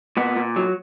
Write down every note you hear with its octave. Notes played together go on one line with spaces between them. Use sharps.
A#2 B3
A#2
F#3